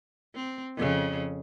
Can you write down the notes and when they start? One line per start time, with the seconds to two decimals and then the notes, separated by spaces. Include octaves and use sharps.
0.35 C4
0.77 F2 C#3